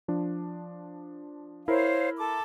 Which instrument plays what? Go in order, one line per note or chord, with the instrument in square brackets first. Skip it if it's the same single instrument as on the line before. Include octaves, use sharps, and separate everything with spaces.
[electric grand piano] F3 D4
[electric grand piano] E4 A#4 [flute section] C5 C#5 F5
[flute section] A4 D6